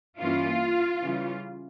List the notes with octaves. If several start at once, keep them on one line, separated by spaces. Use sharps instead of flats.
G2 E3 A#3 C#4 E4 F4
C#3 E3 G3 C#4